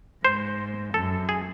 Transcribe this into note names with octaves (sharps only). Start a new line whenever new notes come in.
G#2 C5
F#2 A4
G#4